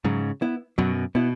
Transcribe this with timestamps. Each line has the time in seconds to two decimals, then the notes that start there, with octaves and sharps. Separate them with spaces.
0.05 G#2 C#3 F#3
0.42 B3 E4
0.78 F#2 B2 F#3
1.15 B2 B3 E4